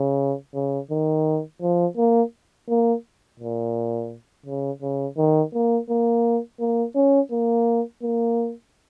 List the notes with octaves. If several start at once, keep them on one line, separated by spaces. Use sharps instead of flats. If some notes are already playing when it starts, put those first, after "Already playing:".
Already playing: C#3
C#3
D#3
F3
A#3
A#3
A#2
C#3
C#3
D#3
A#3
A#3
A#3
C#4
A#3
A#3